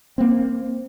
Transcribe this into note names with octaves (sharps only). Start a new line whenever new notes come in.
A#3 C4